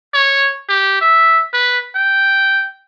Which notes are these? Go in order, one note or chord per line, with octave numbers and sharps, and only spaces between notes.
C#5
G4
E5
B4
G5